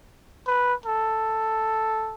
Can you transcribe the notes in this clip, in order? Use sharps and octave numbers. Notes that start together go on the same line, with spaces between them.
B4
A4